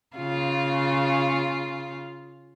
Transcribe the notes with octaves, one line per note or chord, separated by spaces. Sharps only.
C#3 F4